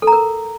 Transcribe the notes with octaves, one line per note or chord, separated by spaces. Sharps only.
A4
A#5
A#4